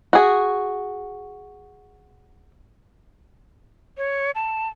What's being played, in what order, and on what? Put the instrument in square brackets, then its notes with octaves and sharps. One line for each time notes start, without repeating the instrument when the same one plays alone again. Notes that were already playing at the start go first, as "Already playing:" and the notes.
[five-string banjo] F#4 G#4
[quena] C#5
A5